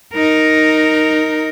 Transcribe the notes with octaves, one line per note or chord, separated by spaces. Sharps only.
D#4 A#4